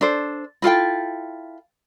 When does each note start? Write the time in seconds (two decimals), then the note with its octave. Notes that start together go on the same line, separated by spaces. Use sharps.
0.01 D4 A4 C5
0.62 E4 F4 A4 G5